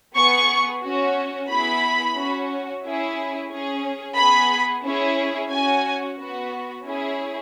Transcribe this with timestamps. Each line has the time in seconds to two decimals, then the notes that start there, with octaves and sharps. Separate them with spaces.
0.15 B3 G#4 C#6
0.82 C#4 F#4
1.49 B3 E4 G#4 B5
2.16 C#4 F#4
2.83 C#4 E4 G#4
3.49 C#4 G#4
4.16 B3 G#4 B5
4.84 C#4 E4 G#4
5.50 C#4 F#4 G#5
6.17 B3 F#4
6.84 C#4 E4 G#4